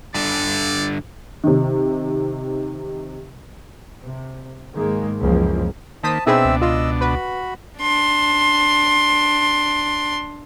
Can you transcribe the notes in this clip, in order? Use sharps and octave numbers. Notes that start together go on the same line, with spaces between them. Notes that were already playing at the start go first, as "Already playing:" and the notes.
G2 D3 D5
C3 D#3
C3
G#2 D#3 G#3 A#3
C#2 F#2 E3 F3 A#3
D#3 A#3 C5 A5 D#6 B6
B2 C4 D4 D#4 G#4 B4 E5 E6
C#2
F4 D#5 E6
F#4 B4 B5
D4 C6